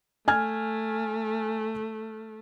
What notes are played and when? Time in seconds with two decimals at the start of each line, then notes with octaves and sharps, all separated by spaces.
0.28 A3 G#5 F6 G#6